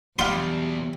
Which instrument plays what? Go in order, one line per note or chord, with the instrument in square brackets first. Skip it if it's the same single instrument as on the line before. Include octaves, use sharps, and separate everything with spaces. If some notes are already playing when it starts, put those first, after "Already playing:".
[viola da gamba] E2 [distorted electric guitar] B2 F#3 [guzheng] G3 [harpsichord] F5 C6